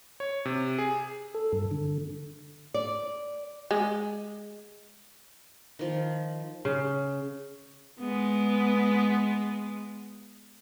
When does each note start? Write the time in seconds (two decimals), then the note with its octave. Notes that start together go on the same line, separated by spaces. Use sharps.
0.20 C#5
0.45 C3
0.78 G#4
1.34 A4
1.52 G2
1.71 D3
2.74 D5
3.71 G#3
5.79 D#3 F3
6.65 C#3
8.00 G#3 B3